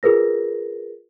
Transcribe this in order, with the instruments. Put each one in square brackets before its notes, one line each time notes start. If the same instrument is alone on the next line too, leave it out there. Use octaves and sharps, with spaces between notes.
[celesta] F4 G#4 A#4 B4 A#6